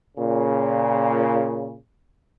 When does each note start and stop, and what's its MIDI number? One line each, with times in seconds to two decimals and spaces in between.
0.17 1.74 46
0.17 1.74 49